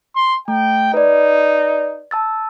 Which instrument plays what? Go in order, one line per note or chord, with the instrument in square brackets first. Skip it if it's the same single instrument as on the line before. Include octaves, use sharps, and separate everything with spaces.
[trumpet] C6
[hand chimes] A3 [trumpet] G5
[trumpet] D#4 [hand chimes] B4 D5
[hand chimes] A5 E6 A6